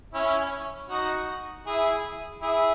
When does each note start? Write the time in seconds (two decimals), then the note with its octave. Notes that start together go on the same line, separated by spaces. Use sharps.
0.13 C#4 E4
0.89 D#4 F#4
1.67 E4 G#4
2.42 E4 G#4